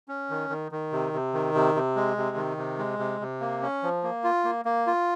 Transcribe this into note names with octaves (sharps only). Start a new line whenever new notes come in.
C#4
D#3
D#3
D#3
C3
C3
D#3
C3
C3
G#3
C3
D#3
C3
G#3
C3
C3
A#3
C#4
F3
A#3
F4
A#3
A#3
F4